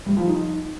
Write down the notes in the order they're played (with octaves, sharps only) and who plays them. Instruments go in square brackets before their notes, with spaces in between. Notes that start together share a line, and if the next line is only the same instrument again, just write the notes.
[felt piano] G3
F3
D#4